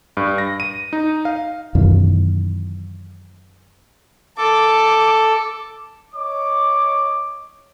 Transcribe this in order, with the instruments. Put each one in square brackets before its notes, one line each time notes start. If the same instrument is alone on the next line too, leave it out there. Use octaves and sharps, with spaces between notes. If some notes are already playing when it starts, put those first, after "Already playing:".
[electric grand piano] G2
A#6
D#7
D#4
F5
[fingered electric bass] F#2 B2 D#3 E3
[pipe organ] A4 [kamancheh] D6
[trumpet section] C#5 D#5 D6